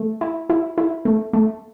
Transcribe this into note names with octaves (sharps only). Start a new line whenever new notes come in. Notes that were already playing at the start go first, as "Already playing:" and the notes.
Already playing: A3
E4
E4
E4
A3
A3